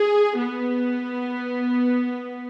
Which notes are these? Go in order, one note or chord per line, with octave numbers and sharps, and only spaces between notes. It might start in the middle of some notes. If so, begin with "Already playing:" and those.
Already playing: G#4
B3